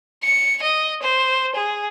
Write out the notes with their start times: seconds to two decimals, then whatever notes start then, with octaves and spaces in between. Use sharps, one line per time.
0.23 C#7
0.62 D#5
1.02 C5
1.55 G#4